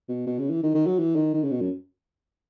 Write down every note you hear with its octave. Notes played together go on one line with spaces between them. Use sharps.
B2
B2
C#3
E3
D#3
D#3
F#3
E3
D#3
D#3
C#3
B2
F#2